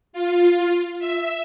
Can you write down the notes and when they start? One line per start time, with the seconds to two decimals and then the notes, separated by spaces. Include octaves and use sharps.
0.13 F4
0.99 E5